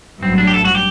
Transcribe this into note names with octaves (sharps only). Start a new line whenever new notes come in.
A1 G2 F#3 C4
D4
G4
A4
F#4
G4